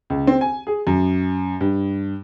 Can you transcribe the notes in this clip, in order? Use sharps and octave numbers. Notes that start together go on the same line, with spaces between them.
C#2
C4
G#5
G#4
F#2
G2